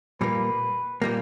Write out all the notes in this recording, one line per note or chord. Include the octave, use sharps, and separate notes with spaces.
A#2 G3 A#3 B4
A#2 G3 A#3